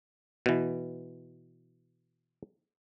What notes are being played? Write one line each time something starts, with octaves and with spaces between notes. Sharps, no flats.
B2 E3